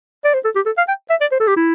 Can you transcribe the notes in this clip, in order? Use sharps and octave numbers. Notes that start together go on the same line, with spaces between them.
D5
C5
A4
G4
A4
F5
G5
E5
D5
C5
A4
G4
E4